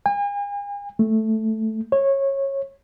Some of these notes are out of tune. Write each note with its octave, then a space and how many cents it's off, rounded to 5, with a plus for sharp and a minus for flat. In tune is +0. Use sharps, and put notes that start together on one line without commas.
G#5 -45
A3 -5
C#5 -20